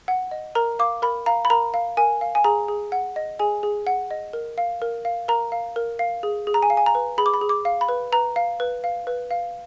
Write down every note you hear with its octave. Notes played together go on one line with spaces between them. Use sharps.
F#5
D#5
A#4 A#5
F5 D6
A#4 B5
F5 A#5
B5
A#4 A#5
F5
A#4 G#5
F5
G#5
G#4 A#5
G#4
F#5
D#5
G#4 G#5
G#4
F#5
D#5
A#4
F5
A#4
F5
A#4 A#5
F5
A#4
F5
G#4
G#4
A#5
G#5
F5
G#5
A#5
B4
G#4 B5
D6
B5
G#4
D6
F5
B5
B4
B4 A#5
F5
B4
F5
B4
F5